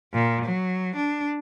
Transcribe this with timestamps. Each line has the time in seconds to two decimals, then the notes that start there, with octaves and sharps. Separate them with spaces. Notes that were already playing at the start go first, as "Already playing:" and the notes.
0.13 A#2
0.44 F#3
0.96 D4